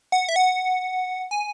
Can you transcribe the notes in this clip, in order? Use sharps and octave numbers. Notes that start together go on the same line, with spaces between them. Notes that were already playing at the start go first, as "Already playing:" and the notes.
F#5
E5
F#5
G#5